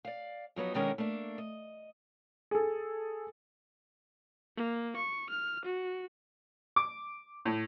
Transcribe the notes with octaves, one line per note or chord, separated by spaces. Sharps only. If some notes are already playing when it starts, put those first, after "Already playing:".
D5 F5
F3 F#3 B3 D#4
B2 D3 D#3 G#3 C#4 A#4
A3 A#3 D4
D#5
G#4 A4
A#3
C#6
F6
F#4
D6
A2